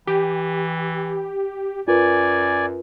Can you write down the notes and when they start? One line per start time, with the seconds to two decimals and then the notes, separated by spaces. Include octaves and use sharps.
0.07 E3 G4
1.88 F#2 F4 A#4 B4 D5 G#5